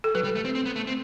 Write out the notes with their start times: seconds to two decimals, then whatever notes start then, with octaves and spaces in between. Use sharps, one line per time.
0.04 A4
0.15 F#3 B4
0.24 G3
0.35 A3
0.45 C4
0.55 C4
0.66 B3
0.76 A3
0.87 C4